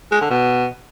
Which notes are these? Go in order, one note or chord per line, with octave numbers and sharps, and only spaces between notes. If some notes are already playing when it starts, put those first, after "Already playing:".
G#3
D3
B2